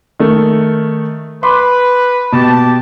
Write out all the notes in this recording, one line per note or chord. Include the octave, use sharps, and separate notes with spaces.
D#3 A3
B4 B5 C6 D6
B2 G4 A5